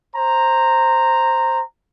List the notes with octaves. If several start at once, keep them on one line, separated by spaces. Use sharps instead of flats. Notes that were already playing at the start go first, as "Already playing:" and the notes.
C5 A#5